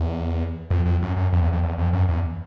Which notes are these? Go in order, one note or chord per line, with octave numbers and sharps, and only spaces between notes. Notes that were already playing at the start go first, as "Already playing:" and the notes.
Already playing: E2
F2
F2
F#2
F#2
F2
E2
F2
E2
F2
F#2
E2